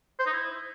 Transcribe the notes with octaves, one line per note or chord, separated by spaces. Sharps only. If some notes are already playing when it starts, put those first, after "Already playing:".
C5
D#4
E4